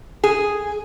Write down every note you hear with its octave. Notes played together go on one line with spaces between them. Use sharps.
G#4